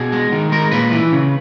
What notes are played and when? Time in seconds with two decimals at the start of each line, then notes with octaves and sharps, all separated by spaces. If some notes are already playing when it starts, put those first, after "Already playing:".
Already playing: B2 G#4
0.12 G#3
0.32 D#3
0.52 G#3 A#4
0.72 A#2 B4
0.92 E3
1.12 C#3